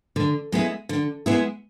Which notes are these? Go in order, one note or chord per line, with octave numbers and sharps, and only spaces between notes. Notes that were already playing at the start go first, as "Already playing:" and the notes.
D3
G#3 B3 E4 G#4
D3
G#3 B3 E4 G#4